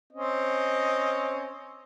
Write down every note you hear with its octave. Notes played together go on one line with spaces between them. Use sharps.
C4 C#4 D#5